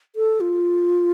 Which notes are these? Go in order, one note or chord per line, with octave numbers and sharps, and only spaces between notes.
A4
F4